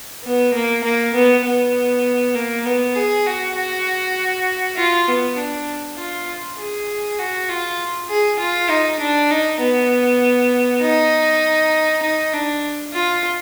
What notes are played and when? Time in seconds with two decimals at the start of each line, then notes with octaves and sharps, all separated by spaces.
0.24 B3
0.54 A#3
0.83 A#3
1.15 B3
1.44 B3
2.35 A#3
2.65 B3
2.95 G#4
3.26 F#4
3.56 F#4
4.77 F4
5.08 B3
5.37 D4
5.97 F4
6.58 G#4
7.19 F#4
7.49 F4
8.09 G#4
8.39 F4
8.70 D#4
8.99 D4
9.31 D#4
9.60 B3
10.82 D#4
12.02 D#4
12.33 D4
12.94 F4